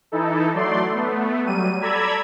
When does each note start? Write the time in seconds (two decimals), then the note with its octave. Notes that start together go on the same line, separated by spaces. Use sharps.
0.12 E3 D#4 E4 A4
0.54 F#3 A3 D5 C6
0.89 A3 B3
1.45 F#3 G3 D#7
1.81 A4 D5 A#5 B5 E6 G#6